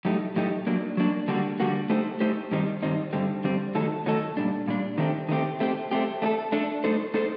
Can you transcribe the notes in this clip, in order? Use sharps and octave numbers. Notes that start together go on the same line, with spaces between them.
A2 F#3 A3 D#4 G4
A2 F#3 A3 D#4 G4
F#3 A#3 D4
F#3 A#3 D4
D3 G3 A#3 F#4
D3 G3 A#3 F#4
A3 D#4 G4 C5
A3 D#4 G4 C5
G2 D#3 G3 C4 D#4
G2 D#3 G3 C4 D#4
G2 D3 G3 C4
G2 D3 G3 C4
D#3 F#3 A3 D#4 A4
D#3 F#3 A3 D#4 A4
A#2 G3 D4
A#2 G3 D4
D#3 A3 C4 G4
D#3 A3 C4 G4
A3 C4 G4
A3 C4 G4
A3 D4 A4
A3 D4 A4
A3 D#4 A4 C5
A3 D#4 A4 C5